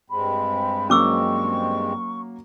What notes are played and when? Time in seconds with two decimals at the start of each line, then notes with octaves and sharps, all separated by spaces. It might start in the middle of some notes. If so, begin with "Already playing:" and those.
0.10 G2 G#3 C4 B5
0.90 F#3 A#3 C#4 C#6 D6 E6